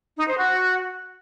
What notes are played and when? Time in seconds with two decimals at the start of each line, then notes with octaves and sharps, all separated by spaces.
0.17 D#4
0.27 C5
0.38 F#4